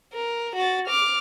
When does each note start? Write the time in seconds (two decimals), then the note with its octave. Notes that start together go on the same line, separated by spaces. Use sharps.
0.13 A#4
0.56 F#4 A6
0.87 D6 F6